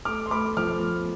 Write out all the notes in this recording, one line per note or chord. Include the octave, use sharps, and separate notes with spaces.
A3 D6 F6
C6
A3 B5 D6
F3 D6 F6